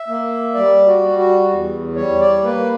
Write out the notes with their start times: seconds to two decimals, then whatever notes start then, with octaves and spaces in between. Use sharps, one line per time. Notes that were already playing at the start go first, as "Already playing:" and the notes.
Already playing: E5
0.08 A#3
0.55 G3 D5
0.87 F#4
1.03 G3
1.18 F#4
1.50 E2
1.96 G3 C#5
2.21 D5
2.43 A#3 B4